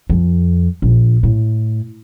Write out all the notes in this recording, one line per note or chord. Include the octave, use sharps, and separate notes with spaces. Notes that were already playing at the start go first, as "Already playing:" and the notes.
F2
A#1
A2